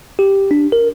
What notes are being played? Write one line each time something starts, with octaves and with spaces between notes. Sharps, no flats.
G4
D4
A#4